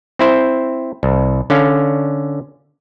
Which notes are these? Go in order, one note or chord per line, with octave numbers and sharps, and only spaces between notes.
C4 E4 C5
C2
D3 C#4 F5